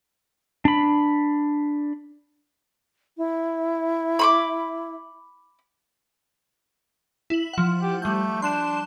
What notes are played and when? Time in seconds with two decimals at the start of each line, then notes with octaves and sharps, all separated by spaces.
0.65 D4 B5
3.18 E4
4.19 B5 C#6 D6
7.30 E4 F#7
7.53 F3 F#5
7.82 G4
8.02 G3 A3 G6
8.42 D4 C6 F#6 E7